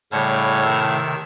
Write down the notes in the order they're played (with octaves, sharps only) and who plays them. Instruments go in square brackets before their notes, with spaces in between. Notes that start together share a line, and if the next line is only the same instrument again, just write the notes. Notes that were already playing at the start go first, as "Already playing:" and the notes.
[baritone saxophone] A2 [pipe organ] C#3 G3 C#5
[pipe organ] C3 D#3 E6